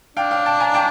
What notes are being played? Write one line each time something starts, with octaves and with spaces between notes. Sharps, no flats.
D4 F5 G5
F5 G5
G5 A5
G#5 A#5
G5 A5